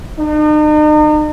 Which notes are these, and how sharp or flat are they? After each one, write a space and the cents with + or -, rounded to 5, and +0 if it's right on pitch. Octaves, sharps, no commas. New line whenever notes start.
D#4 -40